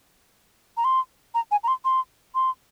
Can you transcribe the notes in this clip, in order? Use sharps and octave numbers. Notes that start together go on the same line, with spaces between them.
A#5
C6
A#5
G#5
A#5
C6
C6
C6